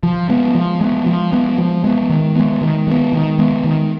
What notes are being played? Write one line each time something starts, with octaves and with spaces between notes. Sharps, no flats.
F3
G#3 B3
F3
G#3 B3
F3
G#3 B3
F3
G#3 B3
D#3
G#3 B3
D#3
G#3 B3
D#3
G#3 B3
D#3